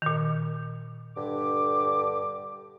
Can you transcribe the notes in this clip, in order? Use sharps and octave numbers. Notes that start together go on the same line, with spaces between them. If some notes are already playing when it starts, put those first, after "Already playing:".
A#2 D#3
G2 D3 D6